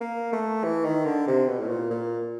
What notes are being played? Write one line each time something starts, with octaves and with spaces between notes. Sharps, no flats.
A#3
A3
E3
D#3
D3
C3
B2
A2
A#2
A#2